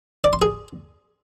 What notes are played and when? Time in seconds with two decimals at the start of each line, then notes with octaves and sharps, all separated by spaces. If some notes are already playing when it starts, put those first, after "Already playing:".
0.24 D5
0.33 C6
0.42 G#4